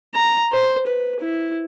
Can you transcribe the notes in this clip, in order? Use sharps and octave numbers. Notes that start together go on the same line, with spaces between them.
A#5
C5
B4
E4